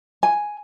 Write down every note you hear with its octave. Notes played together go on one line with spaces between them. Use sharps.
G#5